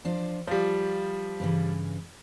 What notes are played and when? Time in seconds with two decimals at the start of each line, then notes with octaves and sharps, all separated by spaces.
0.05 F3 D4 F4
0.47 F3 G3 F4
1.40 G2 C#3 E3